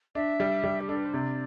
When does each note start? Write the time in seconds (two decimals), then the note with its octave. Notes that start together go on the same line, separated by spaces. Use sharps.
0.15 D4 E5
0.40 G3
0.64 G3
0.80 G4
0.88 D4 A4
0.96 B4
1.05 C5
1.13 C3 D5